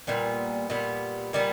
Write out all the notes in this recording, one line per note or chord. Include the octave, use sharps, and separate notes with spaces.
A#2 G3 B3
A#2 G3 B3
A#2 G3 B3